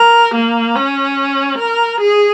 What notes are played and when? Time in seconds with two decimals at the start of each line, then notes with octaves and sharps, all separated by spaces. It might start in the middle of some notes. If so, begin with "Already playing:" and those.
Already playing: A#4
0.34 A#3
0.76 C#4
1.58 A#4
2.01 G#4